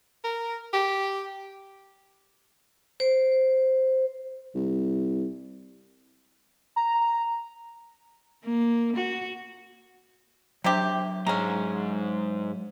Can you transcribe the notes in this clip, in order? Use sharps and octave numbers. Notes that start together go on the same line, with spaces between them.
A#4
G4
C5
C2
A#5
A#3
F#4
C3 F#3 C4 D4 G4
G#2 G#3 C#4 A#5